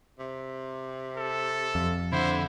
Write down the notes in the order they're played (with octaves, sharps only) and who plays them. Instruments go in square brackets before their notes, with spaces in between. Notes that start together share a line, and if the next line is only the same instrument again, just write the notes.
[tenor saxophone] C3
[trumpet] A4
[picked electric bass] F2
[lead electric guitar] D3 [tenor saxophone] E4 [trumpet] C5